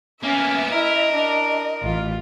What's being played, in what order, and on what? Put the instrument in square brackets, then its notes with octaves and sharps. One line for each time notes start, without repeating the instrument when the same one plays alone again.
[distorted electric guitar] A#3 B3 [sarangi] C#4 [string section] E5 [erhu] G#5
[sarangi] E4 [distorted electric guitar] A#4 [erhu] D#5
[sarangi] D4
[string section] A1 E3 [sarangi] F4